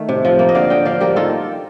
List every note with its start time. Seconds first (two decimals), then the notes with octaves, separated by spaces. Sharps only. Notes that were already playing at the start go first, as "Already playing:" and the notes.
Already playing: D#3 A3
0.09 C3
0.25 F3
0.39 A#3
0.49 D#5
0.55 D3 D5 F5
0.70 D3 D#5 G5
0.85 F3 D5 F5
1.01 A#3 G4 A#4
1.16 D#3 F4 A4